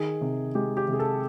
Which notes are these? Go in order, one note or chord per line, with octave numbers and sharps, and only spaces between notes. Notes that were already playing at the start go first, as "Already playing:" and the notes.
Already playing: D#3 G#4
C3
G#3 G4
G4
C3 G#4
A4